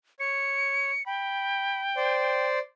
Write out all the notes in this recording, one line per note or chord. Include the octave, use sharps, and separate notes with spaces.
C#5 C#7
G5 B5
C5 D5